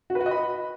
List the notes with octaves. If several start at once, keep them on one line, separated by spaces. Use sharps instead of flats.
F#4
B4
F#4
D#5
B5